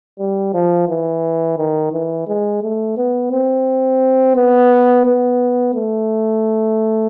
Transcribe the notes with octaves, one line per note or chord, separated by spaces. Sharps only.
G3
F3
E3
D#3
E3
G#3
A3
B3
C4
B3
B3
A3